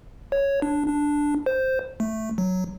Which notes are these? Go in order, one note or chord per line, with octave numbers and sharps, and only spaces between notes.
C#5
D4
D4
C5
A3
F#3